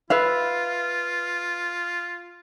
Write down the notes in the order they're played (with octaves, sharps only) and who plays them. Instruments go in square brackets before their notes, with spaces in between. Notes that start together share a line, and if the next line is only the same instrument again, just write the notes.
[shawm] F4 [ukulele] B4 E5 F5